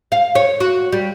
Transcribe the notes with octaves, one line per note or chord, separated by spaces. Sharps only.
F5
C#5
F#4
G3